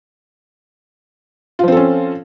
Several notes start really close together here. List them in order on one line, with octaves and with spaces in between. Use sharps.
F4 F3 C4 A4 C#4